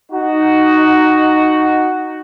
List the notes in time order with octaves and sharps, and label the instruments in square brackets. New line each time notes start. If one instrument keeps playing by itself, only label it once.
[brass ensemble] D#4 F#4